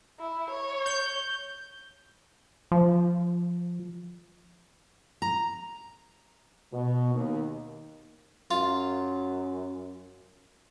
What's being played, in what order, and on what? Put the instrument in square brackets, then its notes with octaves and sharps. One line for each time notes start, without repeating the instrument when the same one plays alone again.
[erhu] E4
C#5
[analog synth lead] G6
[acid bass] F3
[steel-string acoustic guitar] A#5
[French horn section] B2
D#2
[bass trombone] F#2 [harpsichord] F4